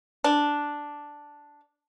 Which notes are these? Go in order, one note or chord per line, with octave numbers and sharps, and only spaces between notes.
D4